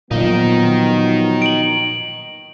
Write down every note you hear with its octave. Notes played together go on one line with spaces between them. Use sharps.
A#2 D#3 F3 F#3 B3 D#4
D7 F#7